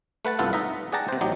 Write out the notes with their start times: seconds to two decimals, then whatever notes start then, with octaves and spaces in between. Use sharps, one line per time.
0.25 A3 B4 F#5 A5
0.39 C2 G2 B3 F4 A4 F#5
0.53 D#4 D#5 E5
0.92 G#4 D5 F#5 G5 A5 A#5
1.08 C3 C5
1.21 A1 F#3 D#4 G4